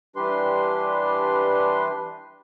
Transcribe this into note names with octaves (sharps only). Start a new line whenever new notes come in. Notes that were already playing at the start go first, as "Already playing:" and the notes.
E3 G3 D4 G4 B4 C6